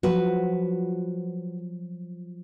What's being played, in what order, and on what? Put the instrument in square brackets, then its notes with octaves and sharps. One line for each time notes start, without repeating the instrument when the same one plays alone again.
[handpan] F3 F#3 [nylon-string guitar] F#4 B4